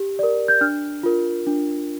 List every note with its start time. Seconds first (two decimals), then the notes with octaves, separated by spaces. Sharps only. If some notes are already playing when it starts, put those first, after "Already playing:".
Already playing: G4
0.19 A#4 D5
0.48 G6
0.61 D4 F6
1.03 F4 A#4
1.47 D4